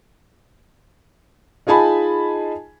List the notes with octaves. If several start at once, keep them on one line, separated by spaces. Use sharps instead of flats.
D#4 F4 G#4 G#5 A5 B5